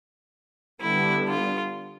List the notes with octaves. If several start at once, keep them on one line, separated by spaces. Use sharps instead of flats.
D3 G3 B3 D4 E4
F4